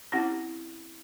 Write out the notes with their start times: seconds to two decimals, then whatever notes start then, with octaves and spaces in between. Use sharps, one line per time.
0.12 C4 C#4 E4 G4 F#5